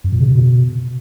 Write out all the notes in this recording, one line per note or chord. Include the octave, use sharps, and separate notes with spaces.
F#2
A#2
C#3
B2